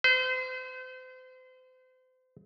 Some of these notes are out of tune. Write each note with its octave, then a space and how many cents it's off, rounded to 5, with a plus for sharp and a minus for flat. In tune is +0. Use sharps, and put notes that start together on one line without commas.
C5 -35